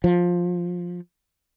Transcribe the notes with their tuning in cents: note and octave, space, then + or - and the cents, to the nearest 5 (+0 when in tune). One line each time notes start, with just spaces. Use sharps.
F3 +15